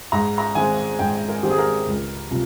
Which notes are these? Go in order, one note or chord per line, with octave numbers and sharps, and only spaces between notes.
G#2 A#5
A#5
D#3 G#3 C4 G#5
G#2 G5
A#4
D#3 G#3 C4 G4
G#4
A#4
C#2
C3 F3